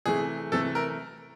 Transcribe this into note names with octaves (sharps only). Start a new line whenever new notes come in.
C3 E3 A3 G#4
C3 E3 A3 A4
A#4